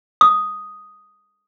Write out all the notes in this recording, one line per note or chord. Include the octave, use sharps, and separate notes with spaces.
D#6